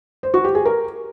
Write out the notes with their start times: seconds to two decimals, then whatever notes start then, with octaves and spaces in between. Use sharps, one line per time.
0.23 C5
0.34 F#4
0.44 G4
0.55 G#4
0.65 A#4